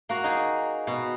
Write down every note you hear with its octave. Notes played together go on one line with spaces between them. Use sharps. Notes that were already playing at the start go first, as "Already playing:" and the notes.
A#3 F#4 A#5
D#4 G#4
B2